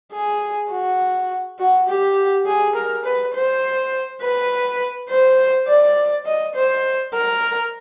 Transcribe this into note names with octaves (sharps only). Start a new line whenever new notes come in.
G#4
F#4
F#4
G4
G#4
A#4
B4
C5
B4
C5
D5
D#5
C5
A#4